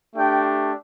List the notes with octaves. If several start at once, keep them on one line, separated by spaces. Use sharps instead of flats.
A3 D4 G4 G5